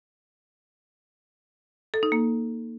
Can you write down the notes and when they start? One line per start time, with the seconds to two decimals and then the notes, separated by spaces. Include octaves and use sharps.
1.94 A4
2.03 D#4
2.12 A#3